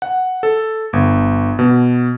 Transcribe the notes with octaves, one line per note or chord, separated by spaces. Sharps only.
F#5
A4
G1
B2